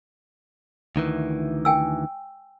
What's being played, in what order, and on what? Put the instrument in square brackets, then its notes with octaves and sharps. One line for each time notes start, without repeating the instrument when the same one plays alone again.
[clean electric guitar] D2 D#3 E3
[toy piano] G5 G#5 E6